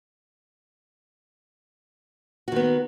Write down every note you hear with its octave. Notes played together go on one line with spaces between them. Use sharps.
D#3 B3 F#4